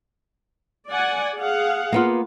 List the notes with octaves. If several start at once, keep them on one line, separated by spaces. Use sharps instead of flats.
D5 F#5 G#5
G#4 F5 F#5
A#3 B3 F4